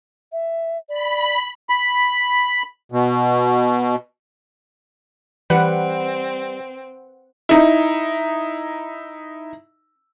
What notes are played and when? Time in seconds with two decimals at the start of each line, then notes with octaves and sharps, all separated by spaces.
0.32 E5
0.89 D5 B5
1.70 B5
2.92 B2
5.50 E3 G3 C4 B4 F#5
7.49 D#4 E4